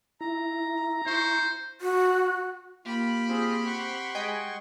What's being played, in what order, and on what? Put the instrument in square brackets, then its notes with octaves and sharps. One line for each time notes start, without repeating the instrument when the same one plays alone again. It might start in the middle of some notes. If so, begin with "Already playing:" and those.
[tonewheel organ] E4 [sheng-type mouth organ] A#5
[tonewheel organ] E4 C#6 [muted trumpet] C5
[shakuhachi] F#4
[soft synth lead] A#3 [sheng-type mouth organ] F4 [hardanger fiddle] G4 B5
[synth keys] C4 [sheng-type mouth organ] F4 G#4
[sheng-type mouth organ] F#5 C6 C#6
[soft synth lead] G#3 [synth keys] D#5 G5 G#5